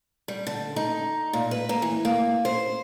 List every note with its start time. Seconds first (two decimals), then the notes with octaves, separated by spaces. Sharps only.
0.28 G3
0.47 D3
0.76 D#4
1.33 A#2
1.51 B4
1.69 A#3
1.82 E3
2.05 A#3
2.45 C5